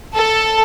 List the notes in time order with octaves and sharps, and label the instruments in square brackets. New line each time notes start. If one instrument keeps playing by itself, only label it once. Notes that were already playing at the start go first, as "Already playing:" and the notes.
[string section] A4